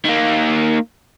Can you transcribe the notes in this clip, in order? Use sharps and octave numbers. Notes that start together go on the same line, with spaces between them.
D#3 A#3